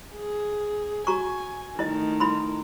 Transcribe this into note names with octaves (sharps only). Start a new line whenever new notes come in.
G#4
F#4 G#5 A#5 C#6
D#3 A3 E4 D#5
E4 B5 C6